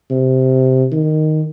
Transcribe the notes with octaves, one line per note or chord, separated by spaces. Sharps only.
C3
D#3